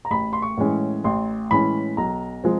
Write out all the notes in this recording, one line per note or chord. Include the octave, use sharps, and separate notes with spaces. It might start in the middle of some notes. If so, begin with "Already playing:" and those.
A#5
A1 B5
C6
C#6
A2 E3 G#3 C#4
A1 C6
A2 E3 G#3 C#4 B5
B1 A#5
F3 G#3 C4